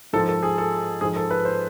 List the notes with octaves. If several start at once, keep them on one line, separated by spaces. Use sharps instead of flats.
G#2 F3 A4
A4
G#4
A4
G#2 F3 G#4
A4
B4
C5